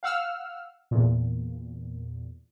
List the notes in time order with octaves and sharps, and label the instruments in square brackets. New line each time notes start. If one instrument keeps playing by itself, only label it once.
[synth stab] F5 F#5 E6 F6
E2 A#2